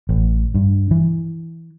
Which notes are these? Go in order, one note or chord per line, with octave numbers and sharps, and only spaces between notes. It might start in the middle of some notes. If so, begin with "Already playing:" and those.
A1
G2
E3